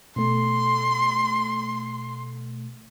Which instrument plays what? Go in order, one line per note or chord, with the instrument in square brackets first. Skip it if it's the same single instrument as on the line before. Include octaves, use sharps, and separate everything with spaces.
[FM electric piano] B2 A3 [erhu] C6